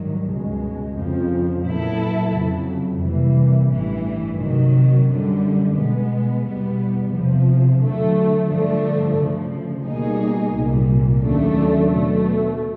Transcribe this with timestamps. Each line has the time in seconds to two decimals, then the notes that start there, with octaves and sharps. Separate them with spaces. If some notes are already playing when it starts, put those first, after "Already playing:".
Already playing: G#1 G2 D#3 F#3
0.28 C#2 B2 G#3
0.96 F2 C#3 F3
1.65 A#2 F#3 B3 E4 A4
2.33 F2 C#3 F#3
3.02 C3 E3 G3 A#3
3.70 A1 G2 E3 G3
4.38 C3 D#3 F#3
5.06 F#2 D3 G3
5.75 B2 G#3 B3
6.43 E2 B2 G3 B3
7.11 E2 C3 F3
7.80 D3 F#3 A3
8.48 G2 D3 F3 A3 D4
9.17 D2 C#3 F3
9.85 B2 G3 A#3 D#4 G#4
10.53 C2 A#2 G3
11.21 D#2 C#3 F#3 A3 D4
11.90 B2 F#3 A3